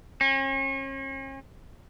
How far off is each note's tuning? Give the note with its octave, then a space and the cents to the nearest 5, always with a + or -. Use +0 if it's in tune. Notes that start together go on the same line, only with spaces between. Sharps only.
C#4 -40